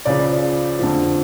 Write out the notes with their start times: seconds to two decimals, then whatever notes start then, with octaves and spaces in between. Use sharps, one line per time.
0.05 C#2 C#3 F3 D5
0.79 F2 D3 F3